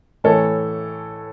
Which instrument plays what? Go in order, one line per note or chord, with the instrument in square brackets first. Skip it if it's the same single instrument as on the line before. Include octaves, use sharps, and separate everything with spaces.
[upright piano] A2 E3 A4 C#5